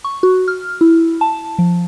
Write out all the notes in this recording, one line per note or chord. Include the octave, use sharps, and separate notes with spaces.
C#6
F#4
F6
E4
A5
F3